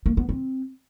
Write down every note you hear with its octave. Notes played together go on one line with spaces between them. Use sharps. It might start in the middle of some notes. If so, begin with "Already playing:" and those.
A#3
B3
C4